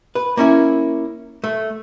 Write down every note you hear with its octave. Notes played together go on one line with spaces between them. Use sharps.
B4
A#3 C#4 E4
A3